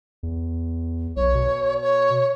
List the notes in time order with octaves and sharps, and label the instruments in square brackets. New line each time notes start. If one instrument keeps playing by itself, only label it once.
[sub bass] E2
[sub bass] B1 [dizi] C#5
[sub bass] B2
[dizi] C#5